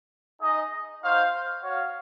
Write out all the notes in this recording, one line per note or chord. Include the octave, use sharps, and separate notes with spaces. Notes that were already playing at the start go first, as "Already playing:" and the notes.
D#4 G#4 D#5
D#4 F#4 C5 F5
F#4 C#5 F5